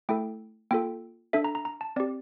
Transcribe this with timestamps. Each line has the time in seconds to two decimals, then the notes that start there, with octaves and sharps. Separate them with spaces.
0.09 A3 E4 A4 G5
0.71 A#3 F4 A4 G5
1.33 D4 A4 E5
1.44 A#5
1.55 A#5
1.65 A#5
1.81 A5
1.96 C4 G4 D5